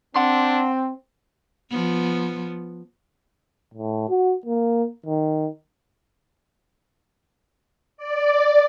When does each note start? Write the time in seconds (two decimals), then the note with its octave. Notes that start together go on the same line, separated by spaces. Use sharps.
0.16 C4 D4 F#5 C6
1.71 F3 B3
3.74 A2
4.09 F#4
4.46 A#3
5.06 D#3
7.97 D5